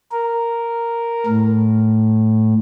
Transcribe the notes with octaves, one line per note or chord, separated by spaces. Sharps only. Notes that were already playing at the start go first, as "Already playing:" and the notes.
A#4
A2